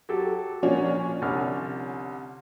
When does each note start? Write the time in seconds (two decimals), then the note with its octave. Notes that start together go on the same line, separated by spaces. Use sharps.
0.09 F#3 G4 A4
0.63 A#2 F3 C#4 D4 F#4
1.22 C2 D3 F6